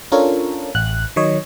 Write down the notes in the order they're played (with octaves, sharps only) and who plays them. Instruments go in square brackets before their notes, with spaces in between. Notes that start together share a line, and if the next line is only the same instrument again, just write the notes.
[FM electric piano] C#4 D4 F4 A4 A#4 C#5
A1 F#6
D#3 F#3 C#5 D#5